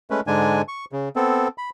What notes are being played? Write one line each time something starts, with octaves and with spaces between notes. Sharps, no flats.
G#3 A3 C#4 B4
G#2 D3 G#3 D4 G#5
C#6
C#3
B3 C4 A4
B5